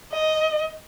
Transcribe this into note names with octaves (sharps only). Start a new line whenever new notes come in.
D#5